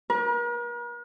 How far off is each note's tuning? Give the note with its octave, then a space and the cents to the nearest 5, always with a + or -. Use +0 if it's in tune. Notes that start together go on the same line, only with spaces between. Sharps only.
A#4 +45